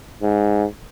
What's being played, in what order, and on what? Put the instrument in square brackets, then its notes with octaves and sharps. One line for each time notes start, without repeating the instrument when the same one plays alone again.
[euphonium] G#2